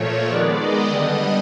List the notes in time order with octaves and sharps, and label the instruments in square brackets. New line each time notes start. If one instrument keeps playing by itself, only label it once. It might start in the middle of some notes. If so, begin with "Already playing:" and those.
Already playing: [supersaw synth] A#2 F3 A3 C#5
D#3 G#3 B3 D5
D#5
D3 G3 B3